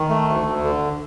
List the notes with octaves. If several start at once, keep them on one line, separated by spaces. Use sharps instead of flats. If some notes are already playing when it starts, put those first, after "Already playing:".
Already playing: D#3
A3
D2
D2
D3